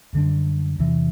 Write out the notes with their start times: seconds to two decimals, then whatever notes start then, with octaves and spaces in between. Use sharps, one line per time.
0.13 F#2 D3 G3 D4
0.79 E2 C3 E3